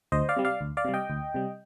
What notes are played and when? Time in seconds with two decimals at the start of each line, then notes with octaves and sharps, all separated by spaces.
0.12 D2 C5 D#5
0.29 D5 F5
0.37 C3 G3
0.45 D5 F5
0.61 D2
0.77 D5 F5
0.85 C3 G3
0.94 D#5 G5
1.10 D2
1.34 C3 G3